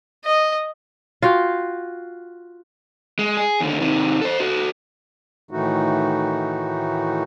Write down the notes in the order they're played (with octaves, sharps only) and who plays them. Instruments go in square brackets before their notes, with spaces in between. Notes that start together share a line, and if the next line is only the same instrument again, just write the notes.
[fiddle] D#5
[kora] F4 F#4 F5 G5
[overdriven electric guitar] G#3
G#4
D#2 D3
C3 D#3
A4 C5
F#4 A4
[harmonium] A2 D#3 E3 A3 D#4 F#4